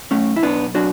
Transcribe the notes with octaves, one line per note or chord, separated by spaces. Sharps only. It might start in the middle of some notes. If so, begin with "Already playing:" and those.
B1 A3 C#4
E4
B1 B3 D4
F#3 D4 F#4